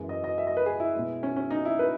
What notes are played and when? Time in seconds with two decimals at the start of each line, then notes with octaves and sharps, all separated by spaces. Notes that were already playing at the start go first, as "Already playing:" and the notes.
Already playing: F#2 E3 G#3
0.09 D#5
0.24 D#5
0.38 E5
0.47 D#5
0.57 B4
0.66 G#4
0.80 E4
0.94 B2 G#3
1.23 C#4
1.36 C#4
1.51 D#4
1.65 E4
1.79 B4